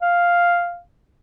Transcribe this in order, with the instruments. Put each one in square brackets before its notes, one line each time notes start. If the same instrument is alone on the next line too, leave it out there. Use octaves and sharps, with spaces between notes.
[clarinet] F5